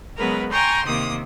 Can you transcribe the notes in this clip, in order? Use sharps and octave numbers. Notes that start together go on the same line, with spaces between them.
C#3 F#3 G#3 B3 A#4 B4
G5 G#5 A#5 C6 C#6 G6
C3 D#3 A#3 D#6